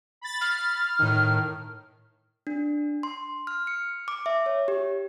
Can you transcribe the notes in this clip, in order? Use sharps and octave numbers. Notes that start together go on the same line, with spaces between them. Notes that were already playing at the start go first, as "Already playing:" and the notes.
B5 A6
F6
A2 D#3
D4
C6
F6
C#7
D6
E5
C#5
G4